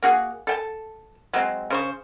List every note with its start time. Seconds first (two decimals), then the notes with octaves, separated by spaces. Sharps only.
0.03 A#3 F#4 G#4
0.47 A4 G5 A5
1.33 F#3 G#3 C4
1.70 C#3 C5 C#6